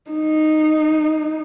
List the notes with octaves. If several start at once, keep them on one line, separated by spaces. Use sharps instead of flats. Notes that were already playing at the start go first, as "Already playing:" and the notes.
D#4